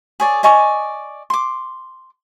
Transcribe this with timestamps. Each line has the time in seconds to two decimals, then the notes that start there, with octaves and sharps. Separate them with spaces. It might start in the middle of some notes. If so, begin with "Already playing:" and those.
0.20 G#4 C#5 D5
0.43 D5 D#5 G#5 C#6
1.30 C6 D6